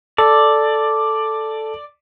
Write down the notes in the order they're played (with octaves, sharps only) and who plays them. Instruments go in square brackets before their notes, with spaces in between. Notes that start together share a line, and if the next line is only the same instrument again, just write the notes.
[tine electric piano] A4 [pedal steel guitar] D5